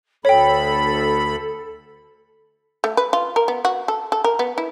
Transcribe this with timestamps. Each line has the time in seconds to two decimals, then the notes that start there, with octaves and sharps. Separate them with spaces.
0.25 D2 A4 C#5 G5 B5
2.84 A3
2.97 B4
3.13 F4
3.36 A#4
3.48 B3
3.65 F#4
3.88 A4
4.12 A4
4.24 A#4
4.39 B3
4.58 E4